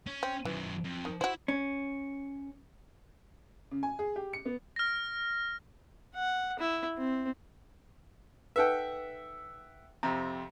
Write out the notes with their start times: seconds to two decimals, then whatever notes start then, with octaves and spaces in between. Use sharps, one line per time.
0.06 C#4
0.23 C4
0.45 F#2 D#3 E3
0.84 F2
1.05 D#3
1.21 E4 F#4 C5
1.48 C#4
3.71 C#3
3.83 G#5
3.99 G#4
4.16 G4
4.33 C#7
4.45 B3
4.76 F6 A#6
6.15 F#5
6.59 E4
6.98 C4
8.56 D#4 A4 B4 E5 F#5 G5
10.03 F2 C3 A#5